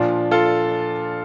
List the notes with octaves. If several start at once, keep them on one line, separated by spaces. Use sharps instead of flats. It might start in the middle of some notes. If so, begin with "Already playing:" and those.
Already playing: A#2 F3 D4 F4
F4 A4